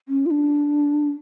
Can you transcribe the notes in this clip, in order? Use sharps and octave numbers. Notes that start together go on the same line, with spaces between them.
C#4
F4
D4